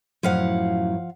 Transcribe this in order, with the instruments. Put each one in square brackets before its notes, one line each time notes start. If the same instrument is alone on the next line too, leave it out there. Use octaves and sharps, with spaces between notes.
[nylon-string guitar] F#2 A2 F#3 [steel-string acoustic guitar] F3 F5 F#5